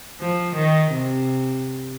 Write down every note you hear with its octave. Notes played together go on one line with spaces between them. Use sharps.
F3
D#3
C3